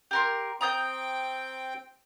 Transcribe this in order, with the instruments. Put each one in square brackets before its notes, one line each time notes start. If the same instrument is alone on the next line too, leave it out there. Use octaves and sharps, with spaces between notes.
[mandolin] G4 A#4 C6
[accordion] C4 G5 [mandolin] A#5 D#6 G6